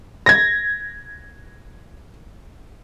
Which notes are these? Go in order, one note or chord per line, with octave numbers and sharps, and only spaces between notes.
G#6 A#6